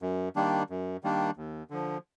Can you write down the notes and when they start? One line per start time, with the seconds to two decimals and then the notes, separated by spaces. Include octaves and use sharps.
0.02 F#2
0.36 D#3 G3 A#3 D4
0.70 F#2
1.03 D#3 G3 A#3 D4
1.37 D#2
1.70 D3 F3